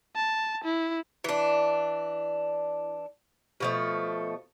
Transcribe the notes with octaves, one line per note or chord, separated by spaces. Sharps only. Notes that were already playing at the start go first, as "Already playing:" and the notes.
A5
E4
E3 D4
B2 F3 A3